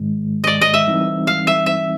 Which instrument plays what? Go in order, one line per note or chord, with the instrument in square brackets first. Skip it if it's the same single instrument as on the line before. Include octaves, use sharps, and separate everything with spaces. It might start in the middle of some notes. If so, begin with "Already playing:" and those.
Already playing: [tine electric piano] G#2 D#3 G#3
[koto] D5 D#5
D#5
E5
[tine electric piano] E3 G3 C4 D#4
[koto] F5
E5
E5